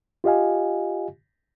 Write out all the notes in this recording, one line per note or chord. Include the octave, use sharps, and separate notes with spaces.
F4 G4 D#5 F5 G#5